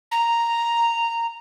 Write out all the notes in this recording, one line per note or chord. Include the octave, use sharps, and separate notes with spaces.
A#5